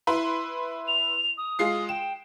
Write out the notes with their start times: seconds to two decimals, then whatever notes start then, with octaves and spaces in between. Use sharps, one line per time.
0.07 E4 B4 C6
0.88 F7
1.38 D#6
1.59 G#3 F4 C7
1.89 G5 E7